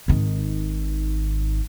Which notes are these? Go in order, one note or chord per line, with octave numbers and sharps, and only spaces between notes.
G#1 D#3